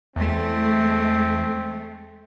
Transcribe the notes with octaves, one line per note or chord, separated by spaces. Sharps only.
E2 G#3 A3 C4